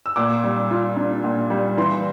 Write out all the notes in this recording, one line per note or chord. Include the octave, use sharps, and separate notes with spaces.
E6
A#2 D6
G3
F4
D4
A#2
G3
E3 C6